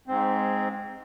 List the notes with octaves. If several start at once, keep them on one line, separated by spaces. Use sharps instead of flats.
G#2 C4